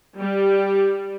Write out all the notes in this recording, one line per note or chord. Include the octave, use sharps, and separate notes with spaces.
G3